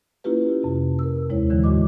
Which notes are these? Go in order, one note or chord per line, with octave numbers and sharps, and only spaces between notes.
A#3 C#4 E4 F4 G4 B4
F2 C3
A#4 E6
D#2 G#3 E4 C5 C#5
D3 E3 F#3 G#3
E2 A2 F#4 D#5 D6